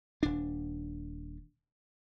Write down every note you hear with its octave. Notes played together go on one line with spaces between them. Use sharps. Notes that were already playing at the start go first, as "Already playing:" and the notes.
D#1 D4